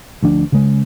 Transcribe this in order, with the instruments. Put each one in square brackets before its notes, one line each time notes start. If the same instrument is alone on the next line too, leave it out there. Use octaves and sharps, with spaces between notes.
[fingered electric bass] D2 F3 D4
C#3 G#3